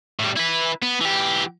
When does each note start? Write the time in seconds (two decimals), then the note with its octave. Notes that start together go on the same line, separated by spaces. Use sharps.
0.19 A2 G3
0.36 E4 B4
0.82 B3
1.01 E3 G4